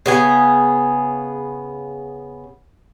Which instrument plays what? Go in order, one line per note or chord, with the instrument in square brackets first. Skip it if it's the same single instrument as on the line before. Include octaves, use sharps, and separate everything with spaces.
[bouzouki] C#3 B3 G#4